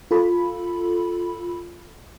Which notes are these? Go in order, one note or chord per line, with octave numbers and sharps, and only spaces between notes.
F4 A4 B5